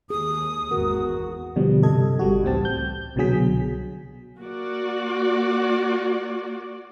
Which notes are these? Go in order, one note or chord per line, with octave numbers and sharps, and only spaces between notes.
D#2 G#4 D#6
G#1 E2 G#2 F#4 A#4
B2 D3 F3 G3
G2 C3 A4 D#5 G#6
G#1 G3 F#4
C#2 A2 E3 C4 G4 A5
G6
C2 B2 D3 F#3 G#4 B6
A#3 F#4 D5